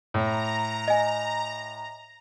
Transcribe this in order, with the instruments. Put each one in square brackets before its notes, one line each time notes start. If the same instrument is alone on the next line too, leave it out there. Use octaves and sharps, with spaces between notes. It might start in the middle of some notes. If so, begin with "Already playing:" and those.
[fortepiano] A2 [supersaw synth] A#5
[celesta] D#5 G#5